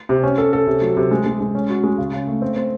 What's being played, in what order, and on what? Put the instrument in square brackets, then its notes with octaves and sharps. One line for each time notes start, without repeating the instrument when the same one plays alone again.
[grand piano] C3
C#4
A4
A4
C3
F#3
C3
G#3
G#3
G#3
C#4
F#4
G#3
C#3
C#3
A3
C4
C4